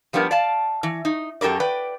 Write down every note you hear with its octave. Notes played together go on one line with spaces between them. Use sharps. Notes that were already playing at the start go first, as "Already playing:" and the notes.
F3 G3 B3 D4 A#4
D5 F5 A5
E3
D#4
F#2 G4 A4 A#4 D5
B4 D5 G5